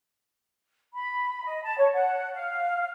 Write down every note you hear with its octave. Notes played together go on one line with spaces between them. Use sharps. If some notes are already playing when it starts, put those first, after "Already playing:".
B5
D#5
A5
C#5
F#5
F5